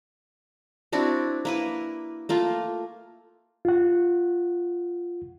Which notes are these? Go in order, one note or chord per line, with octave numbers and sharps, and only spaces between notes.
C4 D4 E4 F#4
A#3 E4 B4
A3 A#3 F4
F4 F#5